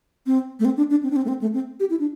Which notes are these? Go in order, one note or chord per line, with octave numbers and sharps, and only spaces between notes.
C4
A3
C4
D4
D4
C4
D4
C4
A3
C4
A3
C4
G4
E4
D4